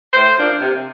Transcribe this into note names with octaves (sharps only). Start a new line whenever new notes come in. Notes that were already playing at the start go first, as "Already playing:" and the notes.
A2 C5
F3 A#3 D4
C3